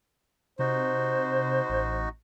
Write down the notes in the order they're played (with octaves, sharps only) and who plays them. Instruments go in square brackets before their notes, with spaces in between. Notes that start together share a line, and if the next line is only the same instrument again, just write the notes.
[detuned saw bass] C3 [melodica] D#4 F#4 [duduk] C5
[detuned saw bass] A1